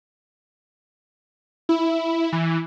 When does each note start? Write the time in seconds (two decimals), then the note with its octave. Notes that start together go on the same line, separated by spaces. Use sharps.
1.69 E4
2.32 E3